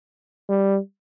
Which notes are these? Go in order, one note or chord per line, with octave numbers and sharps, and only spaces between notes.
G3